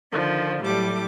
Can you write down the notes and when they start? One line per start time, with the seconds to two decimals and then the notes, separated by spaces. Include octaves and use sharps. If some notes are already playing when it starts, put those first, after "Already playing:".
0.12 D3 D#3 F3
0.63 A2 F#3 G3 A3 D6